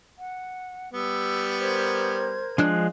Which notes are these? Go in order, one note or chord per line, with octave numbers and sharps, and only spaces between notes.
F#5
G3 B3 E6
A#4 C5 G#6
F3 G#3 D4 F#6